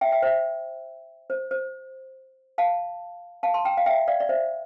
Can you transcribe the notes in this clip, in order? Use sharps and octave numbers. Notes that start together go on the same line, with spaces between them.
E5 G5
E5 G5
C5 E5
C5
C5
F5 A5
F5 A5
A5 C6
G5 A#5
F5
E5 G5
D5 F5
D5
C5 E5